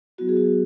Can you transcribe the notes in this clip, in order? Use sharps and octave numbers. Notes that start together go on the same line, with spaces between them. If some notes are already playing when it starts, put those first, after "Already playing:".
F#3 B3 E4 F#4
G#4
F#4